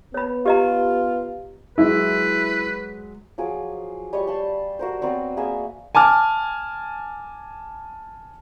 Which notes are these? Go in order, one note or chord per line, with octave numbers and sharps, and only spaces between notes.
B3 C#5 B5
F4 G4 D#5 A#5
F#3 G#3 E4 B4
F3 F#3 G#4 D6
G3 C#5 D#5 C#6
A5 B5 C6
F#4 A#4 C5
F#3 B3 C4 D5
A#3 B3 G#4 E5
G#5 A5 D6 F6